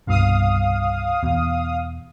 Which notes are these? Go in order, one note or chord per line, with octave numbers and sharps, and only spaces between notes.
C2 G2 B2 F5 D#6
E2 B2